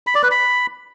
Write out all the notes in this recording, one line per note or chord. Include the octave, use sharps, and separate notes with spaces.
B5
D5
B4
B5